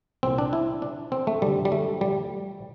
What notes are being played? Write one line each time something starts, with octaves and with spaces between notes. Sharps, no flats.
C2 A#2 C4
D4
E4
D4
C4
A3
G2 D3 G3
G3
A3
G3